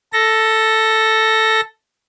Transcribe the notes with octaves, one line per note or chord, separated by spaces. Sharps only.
A4 A#6